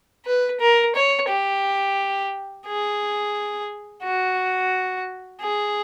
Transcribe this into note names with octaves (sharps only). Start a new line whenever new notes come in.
B4
A#4
C#5
G4
G#4
F#4
G#4